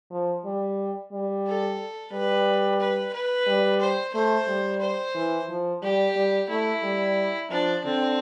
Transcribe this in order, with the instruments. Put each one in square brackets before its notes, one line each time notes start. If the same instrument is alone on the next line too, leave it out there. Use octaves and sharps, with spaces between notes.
[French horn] F3
G3
G3
[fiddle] A4
[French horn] G3 [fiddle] B4
[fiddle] B4
B4
[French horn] G3
[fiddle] C5
[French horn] A3 [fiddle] C5
[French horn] G3
[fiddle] C5
[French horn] E3
F3
[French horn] G3 [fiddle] G4
[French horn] G3
[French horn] A3 [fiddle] E4
[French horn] G3
[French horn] F3 [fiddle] D4
[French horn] D3 [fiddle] C4